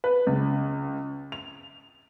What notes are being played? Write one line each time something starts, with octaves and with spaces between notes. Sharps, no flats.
B4
C#2
F7